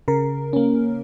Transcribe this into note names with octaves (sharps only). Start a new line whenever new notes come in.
C#3 A#4
A#3 C#4